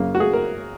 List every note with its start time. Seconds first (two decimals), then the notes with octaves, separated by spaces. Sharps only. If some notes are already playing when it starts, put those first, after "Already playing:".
Already playing: F#2 C#3 A#3
0.15 F#4
0.20 G#4
0.33 A#4